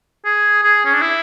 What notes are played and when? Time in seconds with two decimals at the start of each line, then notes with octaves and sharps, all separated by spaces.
0.25 G#4
0.63 G#4
0.85 C#4
0.94 D4
1.01 E4